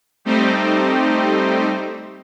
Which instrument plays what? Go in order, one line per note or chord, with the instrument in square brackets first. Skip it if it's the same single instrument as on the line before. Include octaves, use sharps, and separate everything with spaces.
[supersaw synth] G3 A3 C4 D#4 G4 C5